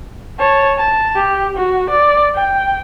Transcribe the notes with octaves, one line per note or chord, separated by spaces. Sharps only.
C#5 A5
A5
G4
F#4
D5
G5